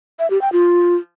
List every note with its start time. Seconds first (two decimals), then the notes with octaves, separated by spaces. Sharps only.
0.19 E5
0.30 G4
0.42 G5
0.53 F4